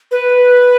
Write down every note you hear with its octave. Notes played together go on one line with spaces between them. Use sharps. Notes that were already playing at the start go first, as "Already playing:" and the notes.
B4